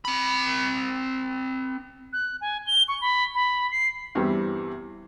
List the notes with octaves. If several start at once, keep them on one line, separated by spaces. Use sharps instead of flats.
C4 B5
F#6
G#5
G7
C#6
B5
B5
C7
E2 G2 E3 G3 C4